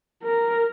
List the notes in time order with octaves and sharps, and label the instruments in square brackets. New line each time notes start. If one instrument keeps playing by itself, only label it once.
[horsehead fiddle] A#4